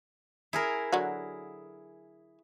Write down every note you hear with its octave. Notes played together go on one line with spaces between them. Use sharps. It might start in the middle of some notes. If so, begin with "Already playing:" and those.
E4 G#4 A#4
D3 F#3 F#4